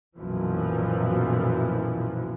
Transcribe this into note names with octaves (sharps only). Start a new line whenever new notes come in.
B1 F#2 A#2 E3 F3